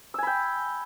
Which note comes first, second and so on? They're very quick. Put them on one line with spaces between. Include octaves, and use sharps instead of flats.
E6 G#5 B5 G5